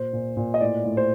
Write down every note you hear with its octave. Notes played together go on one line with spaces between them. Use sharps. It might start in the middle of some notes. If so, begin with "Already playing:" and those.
Already playing: A#2 C5
A#2
A#2
D#5
A2 D5
A2
C5